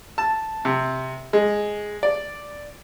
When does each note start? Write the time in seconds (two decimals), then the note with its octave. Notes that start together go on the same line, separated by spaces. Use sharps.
0.18 A5
0.65 C3
1.33 G#3
2.03 D5